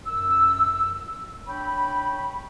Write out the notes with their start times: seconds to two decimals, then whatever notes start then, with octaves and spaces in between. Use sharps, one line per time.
0.05 F#2 E6
1.48 D4 C#5 G5 B5